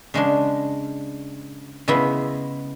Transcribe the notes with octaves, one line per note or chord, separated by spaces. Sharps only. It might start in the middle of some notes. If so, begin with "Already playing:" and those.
C#3 G#3 D4
C#3 G#3 B3 E4